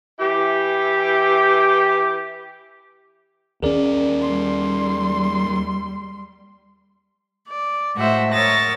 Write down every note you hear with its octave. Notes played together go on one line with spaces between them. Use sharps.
E3 E4 G4
D#2 C#4 G#4 A#4 D5
G3 C6
D5
A2 G#3 A3 F#4 C5 E5
A#4 C#5 D#6 E6 A6 A#6